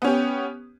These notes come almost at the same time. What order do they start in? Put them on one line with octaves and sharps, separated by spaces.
B3 C#4 G4